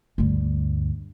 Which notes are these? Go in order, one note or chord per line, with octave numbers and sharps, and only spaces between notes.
D2 G2